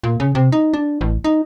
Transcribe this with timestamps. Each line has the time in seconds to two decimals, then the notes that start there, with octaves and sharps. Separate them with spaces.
0.03 A#2
0.20 C#3
0.35 C3
0.52 D#4
0.74 D4
1.01 A1
1.24 D#4